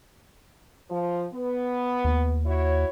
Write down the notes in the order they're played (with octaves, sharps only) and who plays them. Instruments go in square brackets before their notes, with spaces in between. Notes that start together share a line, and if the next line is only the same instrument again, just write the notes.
[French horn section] F3
B3
[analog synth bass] D#2
[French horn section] E4 F#4 C#5